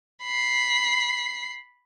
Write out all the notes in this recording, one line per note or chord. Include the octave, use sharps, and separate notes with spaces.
B5 C7